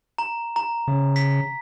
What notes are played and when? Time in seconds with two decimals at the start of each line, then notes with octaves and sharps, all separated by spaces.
0.18 A#5
0.56 A#5
0.88 C#3
1.16 B6